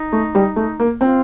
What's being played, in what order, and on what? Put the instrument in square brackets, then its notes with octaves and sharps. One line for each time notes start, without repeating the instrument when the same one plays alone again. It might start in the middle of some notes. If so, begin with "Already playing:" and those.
Already playing: [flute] D#4
[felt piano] A3
G3
A3
A#3
[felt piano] C4 [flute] F4